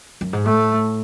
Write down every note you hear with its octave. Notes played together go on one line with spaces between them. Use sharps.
F#2
G#2
A2 A3